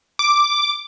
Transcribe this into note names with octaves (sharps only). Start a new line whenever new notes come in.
D6